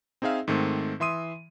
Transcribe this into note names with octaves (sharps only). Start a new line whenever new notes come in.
C4 D#4 G#4 E5 F5
G#2 D#3 A3 C4
E3 E5 C6 D#6 D#7